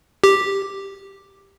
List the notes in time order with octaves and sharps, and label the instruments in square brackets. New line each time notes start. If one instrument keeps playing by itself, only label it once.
[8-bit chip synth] G4